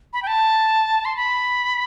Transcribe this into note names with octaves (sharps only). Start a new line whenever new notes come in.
B5
G5
A5
C6
B5